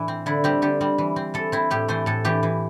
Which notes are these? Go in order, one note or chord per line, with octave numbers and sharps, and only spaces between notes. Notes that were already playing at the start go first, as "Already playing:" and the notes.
Already playing: A2 E3 D4
C4
D3 E4
G3 C4 G4
D3 G4
G3 C4
E3
C4
E3 A4
C4 E4
A2 G4
E3 A3 C5
A2 A4
E3 A3 G4
E3